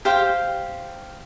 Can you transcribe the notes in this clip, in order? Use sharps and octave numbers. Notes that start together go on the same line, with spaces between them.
G4 C5 F5 G5